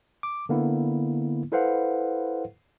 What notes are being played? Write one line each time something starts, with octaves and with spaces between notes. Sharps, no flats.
D6
D3 A#3 B3 E4
E4 A4 B4 C5 F5 F#5